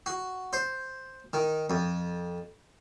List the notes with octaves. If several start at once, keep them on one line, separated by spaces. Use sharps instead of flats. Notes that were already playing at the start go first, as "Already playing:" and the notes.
F#4
C5
D#3
F2